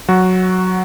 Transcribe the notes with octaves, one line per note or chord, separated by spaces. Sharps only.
F#3 F#4